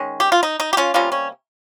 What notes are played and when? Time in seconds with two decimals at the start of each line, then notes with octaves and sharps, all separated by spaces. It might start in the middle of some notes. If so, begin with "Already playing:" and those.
Already playing: D#3 G#3 C#4
0.20 G4
0.32 F4
0.43 D#4
0.60 D#4
0.73 G4
0.77 C#4 F4
0.94 C3 G3 A#3 C#4 F4
1.12 C#4